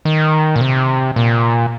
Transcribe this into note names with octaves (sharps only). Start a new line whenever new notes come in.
D#3
A#2
C3
A#2